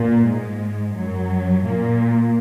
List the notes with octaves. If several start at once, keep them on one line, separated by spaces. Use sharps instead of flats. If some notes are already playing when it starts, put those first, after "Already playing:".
Already playing: A#2 A#3
G#2 G#3
F#2 F#3
A#2 A#3